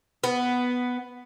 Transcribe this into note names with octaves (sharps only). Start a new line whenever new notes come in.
B3